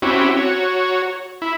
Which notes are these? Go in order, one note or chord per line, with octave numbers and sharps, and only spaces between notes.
C4 C#4 E4 F#4 G4
F#4 C#5
E4